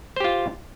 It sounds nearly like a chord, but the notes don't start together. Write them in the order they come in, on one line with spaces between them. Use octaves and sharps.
C5 G4 F4